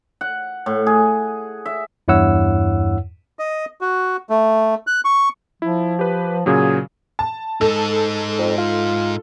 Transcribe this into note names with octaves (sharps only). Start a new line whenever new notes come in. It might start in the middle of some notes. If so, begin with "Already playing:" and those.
F#5
A2
G#4
E5
E2 G2 E4 C#5 F#5 E6
D#5
F#4
A3
F#6
C#6
F3 E4
G4 B4
A#2 C#3 F#3 G#4
A5
G#2 D#4 A4
F2
F4